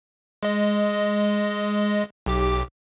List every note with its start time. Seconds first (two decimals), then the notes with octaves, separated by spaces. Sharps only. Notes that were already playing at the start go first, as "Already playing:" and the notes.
0.43 G#3 D#5
2.26 B1 G4 D6